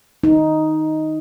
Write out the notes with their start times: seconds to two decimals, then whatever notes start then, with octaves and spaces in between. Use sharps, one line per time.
0.24 D#4